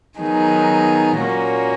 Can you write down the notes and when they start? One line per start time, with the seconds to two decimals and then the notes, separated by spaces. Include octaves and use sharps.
0.18 D#3 F#3 B3 D#4 G#4
1.18 A#2 A#3 C#4 F#4